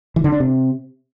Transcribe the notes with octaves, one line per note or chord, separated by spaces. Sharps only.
E3
D3
D4
C3